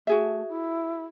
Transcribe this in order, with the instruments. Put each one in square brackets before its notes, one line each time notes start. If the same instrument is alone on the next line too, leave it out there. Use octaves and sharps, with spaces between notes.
[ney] A3 [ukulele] F#4 G#4 E5
[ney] E4